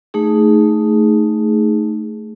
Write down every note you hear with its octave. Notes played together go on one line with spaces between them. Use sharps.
A3 D#4 G#4